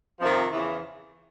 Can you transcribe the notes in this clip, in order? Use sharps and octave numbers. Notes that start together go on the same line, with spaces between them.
F2 C3 D#3 F3
E2 C#3 E3